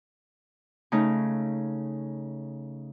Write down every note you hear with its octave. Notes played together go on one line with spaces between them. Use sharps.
C#3 A3 D#4